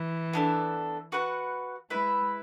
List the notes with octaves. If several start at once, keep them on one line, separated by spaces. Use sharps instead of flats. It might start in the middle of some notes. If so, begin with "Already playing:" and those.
Already playing: E3
B3 D4 A4
F#4 B4 F#5
G#3 E4 B4 E5